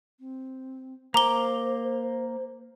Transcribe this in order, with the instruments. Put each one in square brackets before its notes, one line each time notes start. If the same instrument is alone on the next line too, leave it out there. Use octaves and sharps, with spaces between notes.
[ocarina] C4
[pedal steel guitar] A#3 D6 [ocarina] C5 [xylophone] A#5 G7